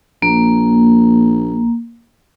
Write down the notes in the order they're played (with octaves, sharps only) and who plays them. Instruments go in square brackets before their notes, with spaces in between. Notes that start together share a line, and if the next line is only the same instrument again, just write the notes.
[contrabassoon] A#1 [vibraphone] A#3